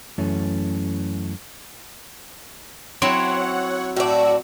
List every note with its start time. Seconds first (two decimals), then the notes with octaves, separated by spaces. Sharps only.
0.18 F#2 E3 A3 C#4
3.02 F#3 C4 E4 C#5 F#5
3.96 A2 F#4 D5 E6